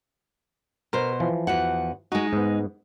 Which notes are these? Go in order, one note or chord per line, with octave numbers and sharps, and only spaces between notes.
B2 A#4 C5
E3 F3
E2 F#4 F#5
G#3 D#4 F#4
G#2 B3